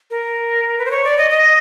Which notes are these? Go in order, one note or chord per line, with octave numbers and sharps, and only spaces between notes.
A#4
B4
C5
C#5
D5
D#5
D#5